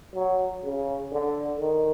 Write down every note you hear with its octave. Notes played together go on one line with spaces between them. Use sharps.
F#3
C#3
D3
D#3